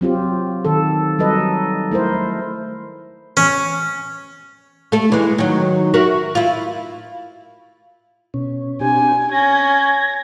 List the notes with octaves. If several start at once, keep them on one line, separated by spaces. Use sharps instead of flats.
F#3 C4 F4 G4
D#3 A4
F#3 G3 D#4 A4 B4 D#5
A3 E4 A#4 C5
C#4
A3 A4
E3 G#3
D#3 F#3
F#4 A#4 E5
E4 F4
B2 C#4
C4 D4 G4 G#5
C#4 G#6 A#6